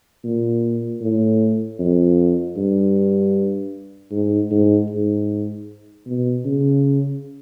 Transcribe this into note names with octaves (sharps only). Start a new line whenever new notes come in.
A#2
A2
F2
G2
G#2
G#2
G#2
B2
C#3